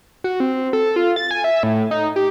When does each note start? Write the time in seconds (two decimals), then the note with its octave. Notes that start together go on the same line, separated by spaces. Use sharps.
0.24 F#4
0.40 C4
0.73 A4
0.96 F4
1.16 A6
1.31 G#5
1.44 E5
1.63 A2
1.91 D#4
2.16 G4